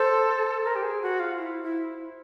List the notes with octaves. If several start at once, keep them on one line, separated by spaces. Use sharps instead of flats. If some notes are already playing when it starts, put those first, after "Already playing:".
Already playing: A4 C5
A#4
G4
G#4
F#4
F4
E4
E4